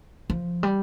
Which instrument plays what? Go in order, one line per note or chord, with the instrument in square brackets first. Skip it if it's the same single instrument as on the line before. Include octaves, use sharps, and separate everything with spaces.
[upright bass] F3
G3